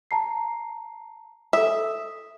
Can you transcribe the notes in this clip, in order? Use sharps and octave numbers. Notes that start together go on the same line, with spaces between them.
A5 A#5 C7
A4 E5 D#6